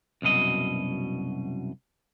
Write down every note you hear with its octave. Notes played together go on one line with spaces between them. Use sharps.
C2 F#2 B2 D#5